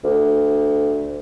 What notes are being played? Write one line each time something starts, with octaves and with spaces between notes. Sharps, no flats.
D2